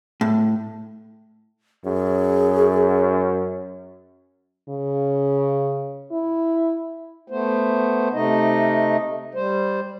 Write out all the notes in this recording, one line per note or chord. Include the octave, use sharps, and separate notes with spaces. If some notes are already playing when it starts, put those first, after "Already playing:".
A2
F#2 G#4
C#3
E4
A3 B3 C5
C3 A3 D#4 D#5
G3 C5